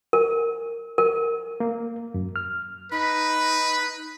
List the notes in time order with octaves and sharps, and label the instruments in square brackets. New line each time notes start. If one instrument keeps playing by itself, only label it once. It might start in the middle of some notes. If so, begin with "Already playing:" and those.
[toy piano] A#4
A#4
[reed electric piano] A#3
F#2
F6
[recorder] D#4 [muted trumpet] B4 [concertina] B5